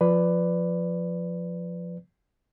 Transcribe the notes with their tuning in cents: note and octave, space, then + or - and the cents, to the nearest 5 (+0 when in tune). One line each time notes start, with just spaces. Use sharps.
F3 +0 B4 +10 D5 +0